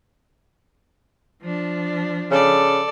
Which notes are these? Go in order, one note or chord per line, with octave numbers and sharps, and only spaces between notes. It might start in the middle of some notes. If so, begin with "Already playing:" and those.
F3 D4
C#3 A4 D5